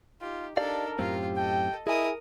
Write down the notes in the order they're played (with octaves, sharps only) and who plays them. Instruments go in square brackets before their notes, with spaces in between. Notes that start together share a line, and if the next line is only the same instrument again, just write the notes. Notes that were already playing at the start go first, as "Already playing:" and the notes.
[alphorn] D#4 [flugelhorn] F4 [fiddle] G4
[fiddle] D4 A4 [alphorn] D#4 [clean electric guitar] G4 D5 F5 [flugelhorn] A#4
[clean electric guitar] F#2 A2 C4 [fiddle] F4 [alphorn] G4
[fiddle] A4 D#5 [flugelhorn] G5
[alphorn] E4 [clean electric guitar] G#4 G#5 [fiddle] A#4 D#6 [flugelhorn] D#5